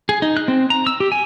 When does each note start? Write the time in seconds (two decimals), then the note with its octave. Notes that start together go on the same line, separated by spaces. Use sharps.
0.09 G#4
0.22 D#4
0.37 F#6
0.48 C4
0.70 A#5
0.87 E6
1.00 G4
1.12 G#5